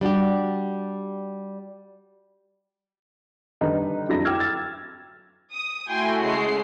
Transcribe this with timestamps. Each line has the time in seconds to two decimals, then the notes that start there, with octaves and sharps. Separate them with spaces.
0.01 G3 D4 F#4 G4
3.61 D3 D#3 G3 D#4 B4
4.08 F2 D3 F#3 E4 E5 A#6
4.25 G5 D6 E6 F6 G#6
4.40 A6
5.55 D#6
5.89 A3 E4 F#4 G5 G#5 C6
6.22 C#3 G#3 C7